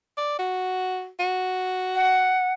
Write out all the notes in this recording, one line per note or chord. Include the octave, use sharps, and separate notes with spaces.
D5
F#4
F#4
F#5